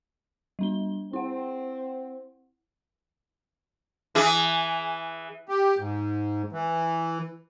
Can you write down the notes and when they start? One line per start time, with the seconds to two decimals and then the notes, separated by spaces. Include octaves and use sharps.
0.59 G3 D4 G7
1.13 C4 E4 F#5
4.15 E3 G#4
5.49 G4
5.79 G#2
6.52 E3